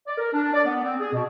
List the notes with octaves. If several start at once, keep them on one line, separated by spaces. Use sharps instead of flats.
D5
A#4
D4
D5
B3
C4
G#4
B2